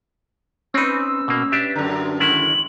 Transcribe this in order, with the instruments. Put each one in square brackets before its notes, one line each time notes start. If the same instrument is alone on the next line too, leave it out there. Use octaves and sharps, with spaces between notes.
[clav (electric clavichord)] C4 D#4 [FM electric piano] C#4 B4 [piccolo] E6
[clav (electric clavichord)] B2 A#3
D4 G4 E5
[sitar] F#2 D3 [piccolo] A#5
[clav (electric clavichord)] D#3 G#3 E4 [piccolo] F#7